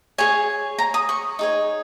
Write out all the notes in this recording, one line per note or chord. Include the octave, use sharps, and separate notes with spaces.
G#4 C#5 G#5
A#5
D#6
C#6
D#4 G#4 C#5